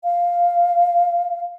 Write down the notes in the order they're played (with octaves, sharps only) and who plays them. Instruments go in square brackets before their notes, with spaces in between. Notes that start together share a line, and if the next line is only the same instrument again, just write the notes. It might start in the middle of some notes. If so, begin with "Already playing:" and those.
[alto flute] F5